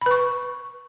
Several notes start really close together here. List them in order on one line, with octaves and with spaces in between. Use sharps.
B5 B4 C#6